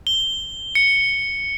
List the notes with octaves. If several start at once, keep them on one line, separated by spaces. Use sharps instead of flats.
G7
C#7